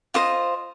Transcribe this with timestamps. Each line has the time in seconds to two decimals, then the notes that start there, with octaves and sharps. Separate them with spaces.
0.14 F4 C5 D#5 D#6